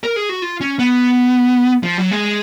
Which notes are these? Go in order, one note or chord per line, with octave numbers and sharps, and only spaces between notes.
A#4
G#4
F#4
F4
C#4
B3
F3
F#3
G#3